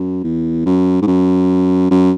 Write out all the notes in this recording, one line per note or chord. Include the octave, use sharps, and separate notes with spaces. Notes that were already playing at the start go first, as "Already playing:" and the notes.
Already playing: F#2
E2
F#2
G#2
F#2
F#2